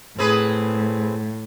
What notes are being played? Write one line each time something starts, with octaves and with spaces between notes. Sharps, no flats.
A2 C4 G#4 B4